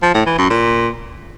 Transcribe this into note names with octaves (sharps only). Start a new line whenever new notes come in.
F3
A2
E3
F#2
A#2